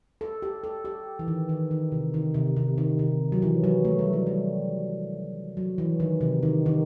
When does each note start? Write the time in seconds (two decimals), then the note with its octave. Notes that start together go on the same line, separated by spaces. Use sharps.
0.21 A4
0.42 G4
0.64 A4
0.85 G4
1.19 E3
1.28 D#3
1.49 D#3
1.71 D#3
1.92 C3
2.14 D#3
2.34 C3
2.56 C3
2.78 D#3
2.99 C3
3.32 F#3
3.42 E3
3.64 F#3
3.85 A3
3.99 G3
4.13 F#3
4.27 G3
5.57 F#3
5.78 E3
6.00 D#3
6.21 C3
6.43 D#3
6.66 D#3